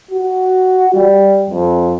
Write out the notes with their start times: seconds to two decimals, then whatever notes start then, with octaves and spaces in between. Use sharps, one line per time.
0.11 F#4
0.94 G3
1.50 F2